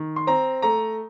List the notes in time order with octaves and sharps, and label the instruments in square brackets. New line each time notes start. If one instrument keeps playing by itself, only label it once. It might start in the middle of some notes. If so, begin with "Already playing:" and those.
Already playing: [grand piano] D#3
C6
C4 A#5
A3 A#5